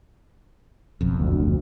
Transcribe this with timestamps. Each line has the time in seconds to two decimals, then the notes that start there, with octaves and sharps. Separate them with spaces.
1.01 F#1 B1 F2
1.19 D2